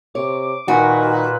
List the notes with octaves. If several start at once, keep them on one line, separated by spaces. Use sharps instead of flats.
C3 C#5 D6
A#2 D#3 F#4 B4 D#5 G5 G#5